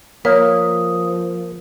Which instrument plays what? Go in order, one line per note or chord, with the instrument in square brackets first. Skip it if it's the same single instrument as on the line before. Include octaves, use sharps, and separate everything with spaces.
[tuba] F3 [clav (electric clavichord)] A#3 [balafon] C#5 [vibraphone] D#6